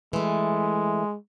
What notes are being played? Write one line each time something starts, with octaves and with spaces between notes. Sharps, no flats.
E3 G#3 A3